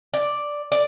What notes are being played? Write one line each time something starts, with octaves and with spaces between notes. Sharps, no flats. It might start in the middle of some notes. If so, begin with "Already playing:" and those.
D5
D5